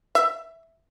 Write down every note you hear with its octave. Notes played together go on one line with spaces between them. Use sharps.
E5